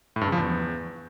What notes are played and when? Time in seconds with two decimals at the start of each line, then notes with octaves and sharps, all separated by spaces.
0.16 A2
0.21 G2
0.27 C#3
0.32 F3
0.38 E2